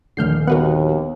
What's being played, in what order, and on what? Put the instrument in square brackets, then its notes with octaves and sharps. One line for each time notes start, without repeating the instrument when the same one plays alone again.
[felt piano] D#1 A#1 D3 [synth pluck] F6 G6 C7
[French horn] D#2 [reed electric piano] B3 F#4 [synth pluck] A#4 B4 F#5